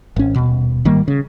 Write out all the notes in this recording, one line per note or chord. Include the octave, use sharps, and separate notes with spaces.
G#1 C#4
D#1 B2
G#1 D#3 G3 A#3
C#3